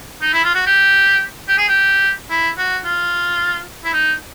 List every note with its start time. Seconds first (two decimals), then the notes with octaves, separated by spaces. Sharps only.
0.21 D#4
0.33 E4
0.44 F4
0.54 F#4
0.66 G4
1.48 G4
1.58 G#4
1.68 G4
2.30 E4
2.58 F#4
2.85 F4
3.84 E4
3.93 D#4